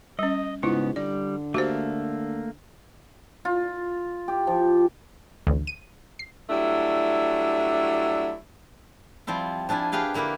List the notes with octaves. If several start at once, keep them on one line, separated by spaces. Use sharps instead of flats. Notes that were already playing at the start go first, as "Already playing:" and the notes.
G3 C#4 D#5
G#2 C#3 B3 E4 F4
D3 G3 D5
A3 A#3 F#4 G4 C5
F4
G4
F3
A1 D2
D#7
C7
F#3 G3 A3 D4 E4
F3 G3 C4 E4
F3 D4 E4 G#5 B5
G4 G#4 B4 F5 G5
D3 A#3 E4 G4 B4